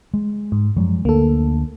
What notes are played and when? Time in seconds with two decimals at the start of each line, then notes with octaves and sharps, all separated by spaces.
0.14 G#3
0.52 G#2
0.77 F#2 F3 G#3
1.05 D2 A#3 A4